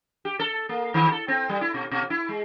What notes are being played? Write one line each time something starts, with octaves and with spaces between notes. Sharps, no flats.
G4
A4
A#3
D#3
A4
C4
G3
E4
B2
B2
E4
G#3